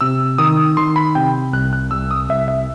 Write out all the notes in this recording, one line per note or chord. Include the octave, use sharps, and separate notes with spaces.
C3 E6
D#3 D#6
D#3 C6
B5
C3 G5
C2 F#6
F#6
C2 E6
D#6
C2 E5
E5